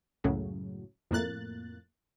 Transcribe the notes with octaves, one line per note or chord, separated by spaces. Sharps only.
C#2 F#2 A2 C#3 F#3
F2 A2 A#3 F#6 A6